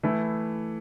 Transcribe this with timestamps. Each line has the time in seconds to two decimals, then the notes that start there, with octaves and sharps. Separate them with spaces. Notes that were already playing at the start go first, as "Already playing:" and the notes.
0.03 E3 A3 E4